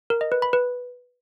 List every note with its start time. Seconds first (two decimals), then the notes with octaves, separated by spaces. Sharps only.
0.10 A#4
0.21 D#5
0.32 B4
0.42 B5
0.53 B4